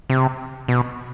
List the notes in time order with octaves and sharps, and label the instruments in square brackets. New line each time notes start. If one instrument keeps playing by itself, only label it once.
[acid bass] C3
B2